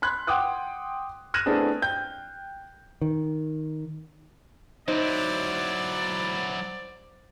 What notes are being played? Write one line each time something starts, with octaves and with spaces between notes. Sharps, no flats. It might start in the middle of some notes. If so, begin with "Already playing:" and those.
B5 C6 F#6 G#6
F#5 G5 C6 D6 D#6 F#6
F6 F#6 G#6 A#6 D#7 E7
A3 B3 C4 D4 E4 G#4
G5 G6
D#3
F#3 D#4 E4 C5 D5